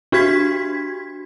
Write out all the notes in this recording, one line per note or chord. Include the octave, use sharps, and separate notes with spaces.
D4 F#4 G4 G#6 B6